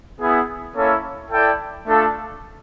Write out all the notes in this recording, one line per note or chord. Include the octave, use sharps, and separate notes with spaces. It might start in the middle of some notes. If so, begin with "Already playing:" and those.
B3 E4 G#4
A#3 C#4 E4 A4 C#5
E4 A4 D5 G5
A3 D4 F4 A4